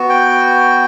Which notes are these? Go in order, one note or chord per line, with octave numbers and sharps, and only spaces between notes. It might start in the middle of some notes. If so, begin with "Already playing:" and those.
Already playing: B3 F#4
G5